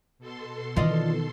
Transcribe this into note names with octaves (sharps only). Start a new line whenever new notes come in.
B2 A4 C6
D#3 E3 C4 F4 D5 D#5